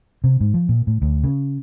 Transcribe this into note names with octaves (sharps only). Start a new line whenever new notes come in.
C3
G#2
F3
A#2
A2
D2
C#3